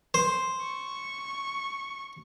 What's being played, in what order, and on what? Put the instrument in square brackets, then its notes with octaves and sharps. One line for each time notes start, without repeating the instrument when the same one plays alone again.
[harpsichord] C5
[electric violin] C#6